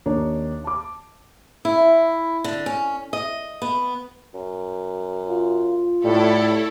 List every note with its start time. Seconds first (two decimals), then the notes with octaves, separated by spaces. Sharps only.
0.06 D#2 A#3 D4 D#4 C#5
0.64 A5 D6
1.65 E4
2.44 D3
2.66 C#4
3.13 D#5
3.62 B3
4.34 F#2
5.28 F4
6.05 A2 G3 E4 A4 C#5